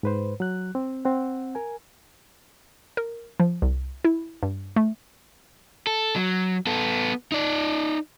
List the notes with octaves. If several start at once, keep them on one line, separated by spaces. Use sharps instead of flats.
G#2 B4 C5
F#3 F#6
C4
C4 F#5
A#4 G#5
A#4
F3
C2
E4
G2
A3
A4
F#3
B3 A4
D#4 D5